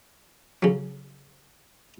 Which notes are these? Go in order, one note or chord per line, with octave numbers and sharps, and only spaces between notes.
C#3 F#3